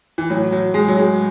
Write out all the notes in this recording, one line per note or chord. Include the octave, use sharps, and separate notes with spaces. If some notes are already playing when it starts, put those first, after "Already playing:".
E3
A2 E3 F#3
F#3
G#3
F#3
G#3